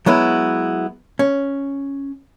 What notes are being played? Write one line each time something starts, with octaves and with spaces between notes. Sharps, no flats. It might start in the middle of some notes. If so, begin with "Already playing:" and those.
F#3 G#3 B3 E4
C#4